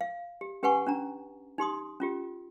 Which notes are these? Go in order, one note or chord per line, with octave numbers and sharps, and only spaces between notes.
F5
G4
C#4 G4 B4 F#5 G#5 C#6
C#4 D4 A#5
D#4 G4 C6 D#6
C#4 F4 G4